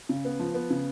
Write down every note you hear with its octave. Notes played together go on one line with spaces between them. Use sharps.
C#3
B3
F3
B3
C#3